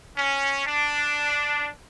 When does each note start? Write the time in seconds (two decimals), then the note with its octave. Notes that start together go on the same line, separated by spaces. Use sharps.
0.17 C#4
0.65 D4